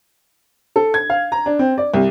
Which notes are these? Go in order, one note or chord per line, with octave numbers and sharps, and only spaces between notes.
A4
G#6
F5
A#5
D4
C4
D5
C2